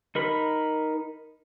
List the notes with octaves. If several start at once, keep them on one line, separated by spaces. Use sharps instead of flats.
D#4 A#4 B5